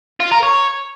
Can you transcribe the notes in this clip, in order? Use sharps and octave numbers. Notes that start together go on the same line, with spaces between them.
F4
A#4
C#5